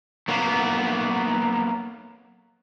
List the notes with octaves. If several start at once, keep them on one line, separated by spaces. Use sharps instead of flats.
F#3 A#3 B3